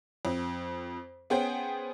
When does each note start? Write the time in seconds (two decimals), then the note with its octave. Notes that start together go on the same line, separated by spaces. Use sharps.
0.25 F2
1.30 B3 C#4 G#4 C5 G5